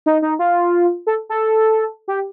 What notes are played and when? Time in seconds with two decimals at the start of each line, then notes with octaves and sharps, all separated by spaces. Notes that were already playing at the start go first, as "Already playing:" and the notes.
0.06 D#4
0.22 D#4
0.39 F4
1.07 A4
1.29 A4
2.08 G4